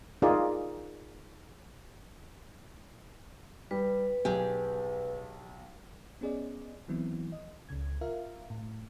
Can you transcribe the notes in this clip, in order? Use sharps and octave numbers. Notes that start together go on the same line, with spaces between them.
D#4 F4 G#4 A#4 D5
G3 B4
B1 G4 G#4
B3 C#4 G#4 D5 D#5
D#3 E3 F#3 B3 C4 E4
D#5
C#2 C#3 G#6
F4 A#4 E5 F5
A2